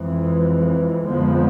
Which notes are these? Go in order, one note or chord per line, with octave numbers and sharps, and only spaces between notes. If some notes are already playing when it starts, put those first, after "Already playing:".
Already playing: F2 E3 G#3
F2 D3 F3 G#3 B3